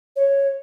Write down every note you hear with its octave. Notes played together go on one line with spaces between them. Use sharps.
C#5